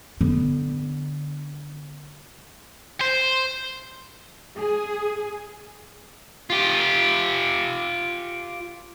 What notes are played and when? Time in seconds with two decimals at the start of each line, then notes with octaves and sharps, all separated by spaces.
0.21 D3 B3
3.01 C5
4.59 G#4
6.50 F4 G4